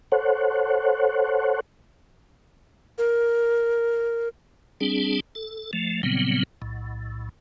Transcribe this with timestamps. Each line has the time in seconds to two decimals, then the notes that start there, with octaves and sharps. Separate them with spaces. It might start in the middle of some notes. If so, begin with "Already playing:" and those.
0.12 A4 C5 C#5 F#5
2.98 A#4
4.81 G3 C4 D4 G#4
5.35 A4
5.73 F3 A3
6.03 A#2 C#3 F#3 G3 B3 C4
6.62 B1 A2